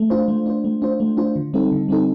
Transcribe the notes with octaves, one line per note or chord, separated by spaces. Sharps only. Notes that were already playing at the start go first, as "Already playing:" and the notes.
Already playing: A3
D4 F4 C5
A3
D4 F4 C5
A3
D4 F4 C5
A3
D4 F4 C5
D3
G3 C4 D#4 A4
D3
G3 C4 D#4 A4